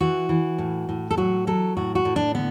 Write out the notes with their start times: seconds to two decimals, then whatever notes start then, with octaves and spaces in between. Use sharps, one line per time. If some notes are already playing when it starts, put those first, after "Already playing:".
0.01 E3 F#4
0.29 E3
0.58 A2
0.89 A2
1.11 A4
1.17 F#3 F#4
1.47 F#3 A4
1.77 A2 F#4
1.95 F#4
2.05 A2
2.16 D4
2.35 D3 B3